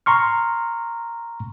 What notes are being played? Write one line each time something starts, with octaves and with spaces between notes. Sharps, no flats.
A#5 C6 C#6 F6